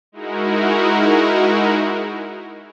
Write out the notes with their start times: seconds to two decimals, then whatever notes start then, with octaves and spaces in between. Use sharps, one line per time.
0.12 G#3 D#4 E4 F#4 A#4